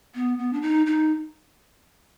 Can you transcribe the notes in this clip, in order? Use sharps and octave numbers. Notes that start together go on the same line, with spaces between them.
B3
B3
D4
D#4
D#4